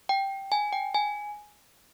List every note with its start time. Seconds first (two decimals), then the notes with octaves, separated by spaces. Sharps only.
0.09 G5
0.52 G#5
0.73 G5
0.94 G#5